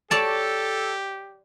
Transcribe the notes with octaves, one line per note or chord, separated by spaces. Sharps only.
G4 A4 C#5 D5 A5